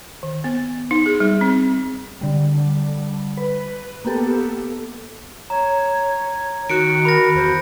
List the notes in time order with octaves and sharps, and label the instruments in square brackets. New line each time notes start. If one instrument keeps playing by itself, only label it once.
[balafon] D#3
B3
D#4
G#4
G3
C4
[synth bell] D3 G3
B4
A#3 B3 G4 A4
[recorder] C#5 [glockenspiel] A#5
[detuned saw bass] D#3 [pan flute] F#4 [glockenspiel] F#6 C#7 D7
[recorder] A#4 [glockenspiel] B5 A#6
[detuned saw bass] E2 [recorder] C5